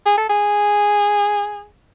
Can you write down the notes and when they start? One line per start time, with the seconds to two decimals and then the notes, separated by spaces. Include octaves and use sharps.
0.06 G#4
0.18 A4
0.30 G#4